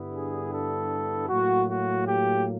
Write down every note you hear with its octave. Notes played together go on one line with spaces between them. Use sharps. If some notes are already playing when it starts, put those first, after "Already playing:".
Already playing: G2 D3 G3 B3 E4
G#4
A4
A2 F#3 A#3 F#4
F#4
G4